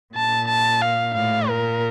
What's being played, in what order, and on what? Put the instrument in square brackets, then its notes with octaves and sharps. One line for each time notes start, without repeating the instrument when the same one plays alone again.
[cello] A#2 [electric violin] A5
[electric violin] A5
F5
[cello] A2 [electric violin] F5
[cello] A#2 [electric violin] A#4